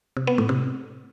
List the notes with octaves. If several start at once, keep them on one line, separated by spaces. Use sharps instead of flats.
C3
B3
A2
C3